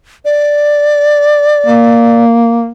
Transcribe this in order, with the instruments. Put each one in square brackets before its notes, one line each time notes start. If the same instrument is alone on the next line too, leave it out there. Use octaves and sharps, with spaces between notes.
[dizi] D5
[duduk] A#3